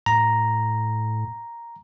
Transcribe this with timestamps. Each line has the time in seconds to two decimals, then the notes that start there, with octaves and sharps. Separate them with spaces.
0.06 A2 A#5